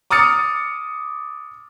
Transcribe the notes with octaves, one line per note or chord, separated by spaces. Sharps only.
D6 D#6 F6 A6 C#7